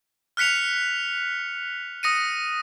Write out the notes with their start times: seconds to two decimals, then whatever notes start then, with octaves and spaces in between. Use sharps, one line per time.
0.37 F6 F#6 B6 C#7 F7
2.03 D#6 A#6 C#7 D#7